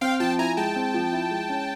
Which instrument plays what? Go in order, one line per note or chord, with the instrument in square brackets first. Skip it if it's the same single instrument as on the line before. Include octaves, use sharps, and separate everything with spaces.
[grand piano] C4 [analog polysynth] F5 G5
[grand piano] F3 [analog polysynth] G5 A5
[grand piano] E4 [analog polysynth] G#5 A#5
[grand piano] G#3 [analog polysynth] G5 A5
[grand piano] C4
F3
E4
G#3
C#4